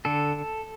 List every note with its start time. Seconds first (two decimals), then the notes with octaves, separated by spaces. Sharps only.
0.05 D3 A4